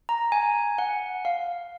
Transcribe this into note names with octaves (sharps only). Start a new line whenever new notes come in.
A#5
G#5
F#5
F5